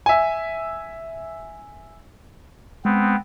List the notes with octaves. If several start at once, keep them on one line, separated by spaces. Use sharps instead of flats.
E5 G#5
G#3 B3 C4